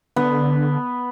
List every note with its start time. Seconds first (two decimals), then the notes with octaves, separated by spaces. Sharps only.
0.16 D3 B3